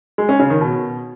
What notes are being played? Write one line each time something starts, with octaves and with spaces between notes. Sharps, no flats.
G#3
C#4
C#3
D#3
B2